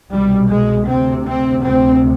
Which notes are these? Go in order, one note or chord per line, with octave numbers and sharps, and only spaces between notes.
C2 B2 G3
G#3
D2 C3 C4
C4
D2 C3 C4